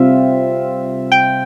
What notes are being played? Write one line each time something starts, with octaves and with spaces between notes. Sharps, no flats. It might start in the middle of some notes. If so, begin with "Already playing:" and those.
Already playing: C3 G3 C4 F4 E5
G5